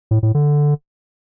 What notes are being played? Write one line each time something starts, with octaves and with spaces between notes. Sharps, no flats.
A2
A2
D3